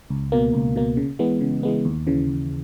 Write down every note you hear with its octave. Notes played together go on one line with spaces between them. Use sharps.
C#2
B2 A#3
C#2
B2 A#3
C#3
E3 G#3 B3
C#3
E3 G#3 B3
D#2
C#3 E3
D#2